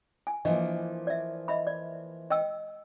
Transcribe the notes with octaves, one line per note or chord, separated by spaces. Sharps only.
G#5
E3 F3 A#3 D4 D#5
D5 E5
D#5 E5 B5
D5
D#5 G5 E6